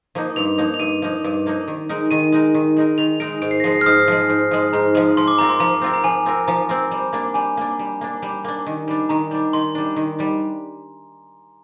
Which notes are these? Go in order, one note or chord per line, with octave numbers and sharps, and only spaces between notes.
F3 A#3 D#4
G2 F7
F3 A#3 D#4
F7
G2 D#7
F3 A#3 D#4
G2
F3 A#3 D#4
D#3
G#3 D#4 A#4
D#3 D#7
G#3 D#4 A#4
D#3
G#3 D#4 A#4
D#3 F7
G#3 D#4 A#4 D7
G#2 D7
C7
A#6
F3 G#3 C7
F6
G#2 D#6
F3 G#3
G#2
F3 G#3
G#2 A#5
F3 G#3
F3 C6
D6
C4 F4 A#4 A#5
C6
F3 A#5
C4 F4 A#4
A#5
F3 G#5
C4 F4 A#4
F3 A#5
C4 F4 A#4
G3
A#3 D4
G3 G#5
A#3 D4
G3
A#3 D4
G3
A#3 D4
D#3
G3 D4
D#3 A#5
G3 D4
D#3 C6
G3 D4
D#3
G3 D4